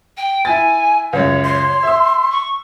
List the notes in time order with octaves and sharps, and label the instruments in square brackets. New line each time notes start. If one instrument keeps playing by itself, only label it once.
[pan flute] G5
[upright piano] E4 A6 [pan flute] G#5
[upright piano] C#2 F#2 [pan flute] C#5
[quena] C6
[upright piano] E5 E6
[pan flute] C#6